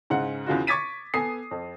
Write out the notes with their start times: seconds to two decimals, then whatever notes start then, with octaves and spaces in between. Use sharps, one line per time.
0.10 G#2 C#3 F#5
0.46 E2 C#3 F4 F#4
0.67 C#6 D6 G#6 A6 B6 D#7
1.14 B3 A4 G#5 D#6 C7
1.51 F2